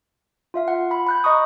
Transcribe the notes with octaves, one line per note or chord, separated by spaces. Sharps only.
F4 E5 F5
F#5
B5
B5 F#6 G6
D#5 A#5 C#6 D#6